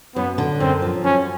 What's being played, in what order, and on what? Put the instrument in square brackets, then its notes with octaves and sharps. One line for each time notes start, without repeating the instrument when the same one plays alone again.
[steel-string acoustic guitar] F#2 [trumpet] B3
[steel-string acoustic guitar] D3
[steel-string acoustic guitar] F#2 [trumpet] C4
[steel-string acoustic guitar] F3
[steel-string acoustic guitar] F#2 [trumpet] C#4